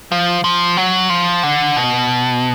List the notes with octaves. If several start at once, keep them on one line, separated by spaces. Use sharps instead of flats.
F3
F3
F#3
F3
D3
B2